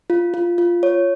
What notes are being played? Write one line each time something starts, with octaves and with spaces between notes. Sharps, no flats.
F4
F4
F4
C#5